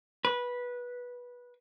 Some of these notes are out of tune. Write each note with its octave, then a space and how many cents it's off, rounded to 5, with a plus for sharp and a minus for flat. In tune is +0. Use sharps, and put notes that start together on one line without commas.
B4 -15